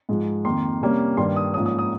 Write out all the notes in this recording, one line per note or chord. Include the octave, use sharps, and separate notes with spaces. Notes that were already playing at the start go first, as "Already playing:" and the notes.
G#2 F3 G#3
F2 D#3 A#3 C6
C3 G3 A#3 C#4
G2 D#3 G3 A#3 C6
D#6
G#2 F3 A#3 C#4 D#6
D#6
D#6